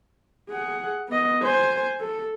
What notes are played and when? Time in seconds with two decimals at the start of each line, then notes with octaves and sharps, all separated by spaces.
0.49 G#4 F#5
1.08 B3 D#5
1.42 C5 G#5
2.00 A4